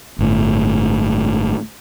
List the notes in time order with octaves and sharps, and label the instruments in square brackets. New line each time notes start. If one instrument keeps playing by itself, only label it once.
[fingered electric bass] G1 A2